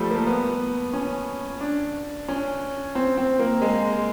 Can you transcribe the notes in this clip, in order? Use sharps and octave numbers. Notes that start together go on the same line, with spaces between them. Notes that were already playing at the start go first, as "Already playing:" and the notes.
Already playing: F3 G3 A3
A#3
B3
C#4
D4
C#4
C4
C4
A#3
G#3